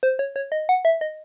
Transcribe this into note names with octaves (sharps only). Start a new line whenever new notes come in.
C5
C#5
C#5
D#5
F#5
E5
D#5